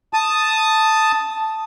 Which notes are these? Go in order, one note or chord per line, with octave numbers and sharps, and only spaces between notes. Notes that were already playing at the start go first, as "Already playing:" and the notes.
A5 D#6